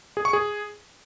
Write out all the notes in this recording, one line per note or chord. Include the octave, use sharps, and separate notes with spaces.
G#4
C#6
G#4